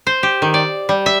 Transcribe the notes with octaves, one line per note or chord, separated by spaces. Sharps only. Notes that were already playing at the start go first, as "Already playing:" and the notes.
C5
G4
D#3
D5
G3
E5